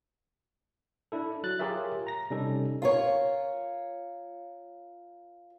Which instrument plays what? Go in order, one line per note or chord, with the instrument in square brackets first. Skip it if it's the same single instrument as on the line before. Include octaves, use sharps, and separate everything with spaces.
[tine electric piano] D4 E4 A4
F#3 F#6 A6
F4 G4 G#4 A#4 C#5 E5
A#5 A#6
C3 G3 C#4 D#4 A4
[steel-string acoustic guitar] F4 A#4 C#5